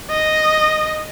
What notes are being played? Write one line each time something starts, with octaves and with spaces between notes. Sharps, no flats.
D#5